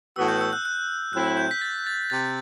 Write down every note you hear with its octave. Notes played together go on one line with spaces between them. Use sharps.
A2 E3 B3 F#4 E6
G6
E6
F#6
F#6
A2 F#3 C4 E4 F#6
G6
B6
A6
A6
C3 A6